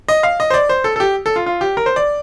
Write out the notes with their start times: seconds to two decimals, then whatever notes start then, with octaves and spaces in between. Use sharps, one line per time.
0.08 D#5
0.23 F5
0.40 D#5
0.50 C5
0.54 D5
0.69 C5
0.84 A4
0.96 A4
1.00 G4
1.26 A4
1.36 F4
1.46 F4
1.61 G4
1.77 A#4
1.86 C5
1.96 D5